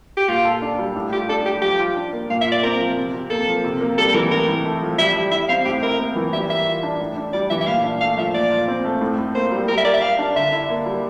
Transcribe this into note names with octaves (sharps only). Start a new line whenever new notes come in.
G4
A#2 F4
A4
D4
G3
A2
F4 G4
D4 A4
G3 G4
F3 G4
F4
D4
A#3
A#2 F5
E5
F4 D5
C4 A#4
F3
C3
C3
A#3 A4
F3
C3
A#3
G3 A4
A4
E3 A#4
A2 A#4
A2
A3
F3
G3 E5
G3
E4 E5
C4 F5
A2 G4
E4 A#4
A#3
E3
G3 E5
A#4 E5
F4
D4
A2
D4
G3 D5
E3 E5
E5
A#2 F5
D4
A3 F5
F3 E5
A#2 D5
F4
C4
A3
A2
A2
A#3 C5
G3
G3 A#4
E5
A#4 D5
E5
G4 F5
D4
D3 E5
E4
A#3
G3